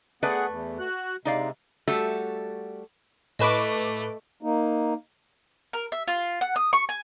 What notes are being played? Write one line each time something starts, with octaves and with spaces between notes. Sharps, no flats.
A3 B3 G#4 B4 D5 F#5
E2
F#4 F#6
C3 G#3 D#4 D5 F5
G3 A3 F#4 A4 E5
A2 A3 B4 D#5 A5 C#6 D6
A#3 D#4
A#4
E5
F4
F#5
D#6
C#6
G#5